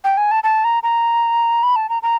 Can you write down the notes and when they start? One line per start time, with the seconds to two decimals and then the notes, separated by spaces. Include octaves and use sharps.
0.04 G5
0.17 G#5
0.31 A5
0.44 A5
0.64 A#5
0.83 A#5
1.63 B5
1.76 A5
1.89 A#5
2.03 A#5